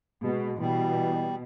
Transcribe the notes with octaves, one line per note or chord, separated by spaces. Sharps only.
B2 G#3
B2 E3 G3